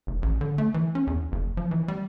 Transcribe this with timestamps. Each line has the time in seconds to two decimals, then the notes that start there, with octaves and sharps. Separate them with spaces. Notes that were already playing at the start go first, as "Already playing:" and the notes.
0.07 F1
0.22 A1
0.41 D3
0.58 A3
0.74 E3
0.95 C#4
1.07 E2
1.32 F#1
1.57 F3
1.71 E3
1.88 G3